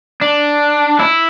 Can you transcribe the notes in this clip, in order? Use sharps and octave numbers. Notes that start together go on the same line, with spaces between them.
D4
E4